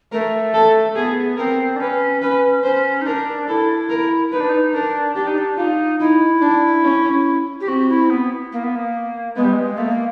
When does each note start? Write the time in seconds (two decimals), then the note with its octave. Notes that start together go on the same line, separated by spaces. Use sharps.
0.12 A3 A#4
0.54 A4
0.96 B3 G#4
1.37 C4 A#4
1.76 D4
1.80 C#4 B4
2.22 C#4 B4
2.63 C#4 C5
3.01 D#4
3.06 D4 A#4
3.48 E4 A4
3.90 A#4
4.32 D#4 B4
4.40 D4
4.49 D#4
4.74 D4 A#4
5.15 D4 G4
5.27 D#4
5.37 D4
5.57 D#4 F4
6.00 D#4 E4
6.41 D4
6.84 C#4
7.61 G4
7.67 C4 F#4
7.89 E4
8.10 B3
8.52 A#3
8.63 B3
8.75 A#3
9.36 G#3 B3
9.44 G3
9.53 G#3
9.77 A3 A#3
9.91 A#3